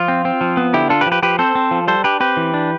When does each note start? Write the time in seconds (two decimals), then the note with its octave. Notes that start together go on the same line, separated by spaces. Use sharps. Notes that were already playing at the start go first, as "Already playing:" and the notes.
Already playing: F3 F4
0.08 C4
0.25 C4
0.41 F3
0.57 B3
0.73 D3 E4 G4
0.89 D4 F4 A4
1.01 G4 B4
1.06 F3
1.12 G4 B4
1.22 F3 G4 B4
1.39 C4 A4 C5
1.55 C4
1.71 F3
1.88 G3 A4 C5
2.04 D4 G4 B4
2.20 C4 G4 B4
2.37 E3
2.54 D4